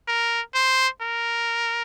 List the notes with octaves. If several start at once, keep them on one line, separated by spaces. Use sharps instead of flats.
A#4
C5
A#4